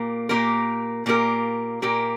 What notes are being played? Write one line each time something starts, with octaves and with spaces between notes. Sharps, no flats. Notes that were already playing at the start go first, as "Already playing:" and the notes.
Already playing: A#2 A#3 G4 A#4
A#2 A#3 G4 A#4
A#2 A#3 G4 A#4
A#2 A#3 G4 A#4